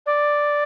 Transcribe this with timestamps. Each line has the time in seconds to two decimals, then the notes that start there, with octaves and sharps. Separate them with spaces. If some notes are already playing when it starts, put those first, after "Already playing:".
0.06 D5